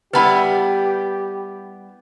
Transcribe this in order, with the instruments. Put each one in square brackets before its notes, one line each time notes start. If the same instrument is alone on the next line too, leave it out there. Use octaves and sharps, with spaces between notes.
[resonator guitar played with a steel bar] G3 B3 E4 [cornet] G4 [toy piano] B4 A5 B5